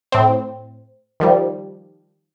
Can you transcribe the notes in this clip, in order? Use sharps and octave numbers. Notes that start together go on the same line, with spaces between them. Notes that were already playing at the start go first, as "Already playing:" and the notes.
A2 C4
D#3 F3 G3